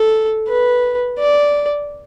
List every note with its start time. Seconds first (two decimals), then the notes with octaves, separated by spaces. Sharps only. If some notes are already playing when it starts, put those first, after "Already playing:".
Already playing: A4
0.48 B4
1.19 D5